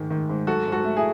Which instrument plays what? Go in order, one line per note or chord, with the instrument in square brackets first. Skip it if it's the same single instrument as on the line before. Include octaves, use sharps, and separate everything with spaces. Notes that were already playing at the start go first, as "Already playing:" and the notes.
Already playing: [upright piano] G#2 D#3
D#3
G#2
F#3 F#4 A4
G#2
F#4 A4
A3
E4 G#4